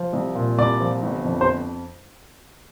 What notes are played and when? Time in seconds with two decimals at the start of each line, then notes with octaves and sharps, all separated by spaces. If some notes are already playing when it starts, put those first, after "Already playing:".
Already playing: F3
0.13 C2
0.35 A#2
0.58 C2 D5
0.81 F3
1.03 G1
1.24 F2
1.41 C5